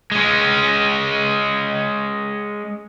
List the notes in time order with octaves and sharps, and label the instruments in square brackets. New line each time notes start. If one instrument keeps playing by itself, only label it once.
[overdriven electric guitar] G#3 C#4